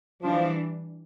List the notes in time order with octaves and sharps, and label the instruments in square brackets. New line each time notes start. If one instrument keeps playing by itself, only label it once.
[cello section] E3 G3 D4 [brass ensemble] F3